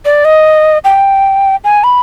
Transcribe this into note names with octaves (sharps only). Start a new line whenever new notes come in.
D5
D#5
G5
G#5
B5